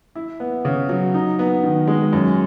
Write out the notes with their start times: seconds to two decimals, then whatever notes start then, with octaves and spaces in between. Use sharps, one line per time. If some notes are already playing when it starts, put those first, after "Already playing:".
0.15 E4
0.40 B3
0.65 C#3
0.89 F#3
1.14 D#4
1.39 B3
1.63 D#3
1.88 G#3
2.13 F#2